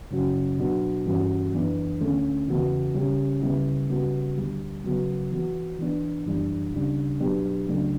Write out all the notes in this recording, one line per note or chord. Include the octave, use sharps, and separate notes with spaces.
F#2 C#3 F#3 C#4 F#4
B2 F#3 B3 D4 F#4
G2 E3 G3 C#4 F#4
F#2 E3 B3 D4
D2 D3 A3 C#4
E2 C#3 E3 B3 F#4
C#3 G3 C#4 G4
D2 C#3 G3 B3 E4
C#3 G3 B3 F#4
D2 D3 G3
C#3 F#3 B3 F#4
E3 B3 F#4
E3 B3 D4
F#2 E3 G3 D4
D2 C#3 G3 D4
B2 F#3 B3 D4 G4
C#2 C#3 F#3 A3 D4